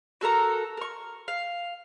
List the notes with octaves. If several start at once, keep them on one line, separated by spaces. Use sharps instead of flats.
F#4 A4 A#4 A#5
A#4 C#6
F5